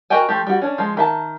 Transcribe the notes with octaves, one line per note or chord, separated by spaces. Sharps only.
F#4 A#4 D#5 G5 G#5
F3 A3 G4
G3 F#4
C#4 D4
F3 G#3
D#3 E5 A5